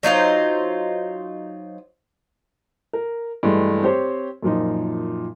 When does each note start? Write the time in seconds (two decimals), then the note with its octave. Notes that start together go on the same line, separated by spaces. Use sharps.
0.03 F#3 D#4 F4 C5
2.93 A#4
3.43 G2 E3 G#3 A3
3.83 C4 G4 C5 C#5
4.43 F#2 A#2 F3 D#4